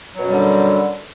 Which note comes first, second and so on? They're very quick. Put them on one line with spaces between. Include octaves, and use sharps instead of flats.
F#3 B2 F#2 G3 D3